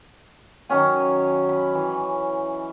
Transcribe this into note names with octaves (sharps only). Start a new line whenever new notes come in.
D#3 F#3 C#4 G#5
B5
E3